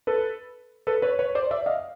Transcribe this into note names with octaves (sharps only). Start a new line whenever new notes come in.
A4 B4
A4 B4
B4 C#5
B4 C#5
C5 D5
D5 E5
D#5 F5